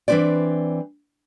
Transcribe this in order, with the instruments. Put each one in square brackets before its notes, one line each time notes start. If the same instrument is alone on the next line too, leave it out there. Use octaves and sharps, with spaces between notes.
[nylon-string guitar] E3 C4 D4 B4 C5 D5